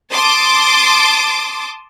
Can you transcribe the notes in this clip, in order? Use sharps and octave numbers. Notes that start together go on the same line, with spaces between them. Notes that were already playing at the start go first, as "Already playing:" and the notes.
A5 C6 D6 D#6 A6